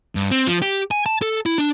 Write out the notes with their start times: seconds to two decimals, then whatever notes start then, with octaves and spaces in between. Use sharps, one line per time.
0.15 G2
0.31 C4
0.47 F3
0.62 G4
0.91 G#5
1.06 A5
1.22 A4
1.46 E4
1.58 D4